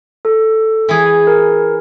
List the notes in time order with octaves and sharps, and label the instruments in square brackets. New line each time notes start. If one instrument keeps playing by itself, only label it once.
[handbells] A4
[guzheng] E3 G#4
[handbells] A#4